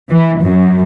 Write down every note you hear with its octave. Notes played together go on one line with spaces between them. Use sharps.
E3
F#2